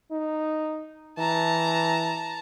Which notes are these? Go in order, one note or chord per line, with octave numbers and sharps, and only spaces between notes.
D#4
E3 A5 A#5